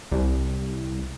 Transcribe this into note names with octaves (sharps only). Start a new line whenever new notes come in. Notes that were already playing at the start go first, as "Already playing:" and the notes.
C2